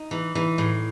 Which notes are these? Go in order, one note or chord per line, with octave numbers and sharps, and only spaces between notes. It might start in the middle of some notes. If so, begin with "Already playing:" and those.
Already playing: D#4
E3
E3
A2